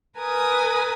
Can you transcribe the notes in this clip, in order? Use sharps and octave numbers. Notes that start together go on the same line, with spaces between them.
A#4 B4 G#5 D#6